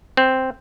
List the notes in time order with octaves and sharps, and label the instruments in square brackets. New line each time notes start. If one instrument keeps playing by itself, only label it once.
[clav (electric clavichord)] C4